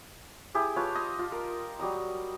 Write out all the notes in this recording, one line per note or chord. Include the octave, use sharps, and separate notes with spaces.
E4 G4 G#4
F4 B4 C#5 A5
D#5 C6
F4
A#4
F#3 G3 D#5 A#5